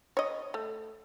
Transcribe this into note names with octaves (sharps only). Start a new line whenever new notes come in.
C#5 D#5
A3